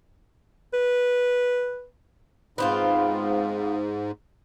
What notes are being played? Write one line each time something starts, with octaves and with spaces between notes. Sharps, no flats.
B4
G#2 B3 C4 F4